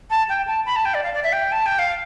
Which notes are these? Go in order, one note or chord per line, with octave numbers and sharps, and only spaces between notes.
A5
G5
A5
B5
A5
G5
D5
F5
D5
E5
G5
A5
G5
F5